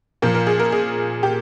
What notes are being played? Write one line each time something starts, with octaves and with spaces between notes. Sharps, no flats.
A#2 F3 A#4
A#4
G#4
A#4
G#4
G4